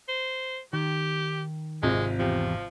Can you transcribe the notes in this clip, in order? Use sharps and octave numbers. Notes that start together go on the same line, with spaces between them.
C5
D#3 G4
G#1 C3 G#3 F4
E2 F3 G4